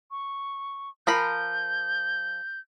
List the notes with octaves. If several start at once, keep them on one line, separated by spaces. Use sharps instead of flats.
C#6
F3 A#4 B5 G6